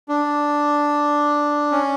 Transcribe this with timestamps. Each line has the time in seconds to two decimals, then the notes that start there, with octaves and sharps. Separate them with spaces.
0.09 D4
1.72 C#4